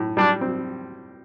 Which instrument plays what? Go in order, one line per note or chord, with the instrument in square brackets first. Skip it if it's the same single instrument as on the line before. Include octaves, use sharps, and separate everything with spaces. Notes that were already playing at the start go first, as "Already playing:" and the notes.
Already playing: [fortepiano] A2
[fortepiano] G3 [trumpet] D4
[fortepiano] C4